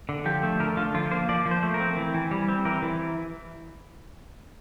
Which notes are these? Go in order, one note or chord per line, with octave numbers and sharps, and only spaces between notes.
D3
F3 G4
A3
D3 A#4
D3 F4
F3 F4
A#3 C5
F3 D5
F3
C5
A3
A#4
C4
E3
E3
G3
C4
E3 A#4
E3